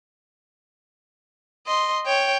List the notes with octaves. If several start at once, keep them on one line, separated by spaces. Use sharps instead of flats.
D#5 C6
C#5 G5